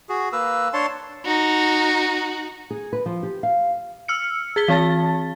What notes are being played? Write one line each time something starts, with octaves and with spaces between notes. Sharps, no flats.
F#4 G#4
A#3 B4 E6
D4 C#5 A5 C6
D#4 F#4
G#4
B4
F3
G4
F5
E6 F6 C#7
G#4 G#6 B6 G7
E3 C4 A5 A6